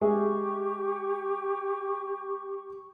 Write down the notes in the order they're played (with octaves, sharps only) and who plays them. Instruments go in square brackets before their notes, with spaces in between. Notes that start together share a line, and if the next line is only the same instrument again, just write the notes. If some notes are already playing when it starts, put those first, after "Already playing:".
[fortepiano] G#3 G#4 E5 [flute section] G4 C#6